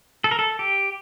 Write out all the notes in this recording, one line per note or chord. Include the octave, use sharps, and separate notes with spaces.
A4
A#4
A4
G4